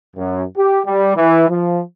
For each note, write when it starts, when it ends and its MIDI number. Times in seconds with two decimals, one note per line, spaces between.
0.16 0.43 42
0.56 0.80 67
0.85 1.12 55
1.16 1.46 52
1.49 1.80 53